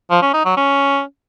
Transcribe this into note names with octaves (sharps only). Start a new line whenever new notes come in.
F3
C#4
D#4
F#3
C#4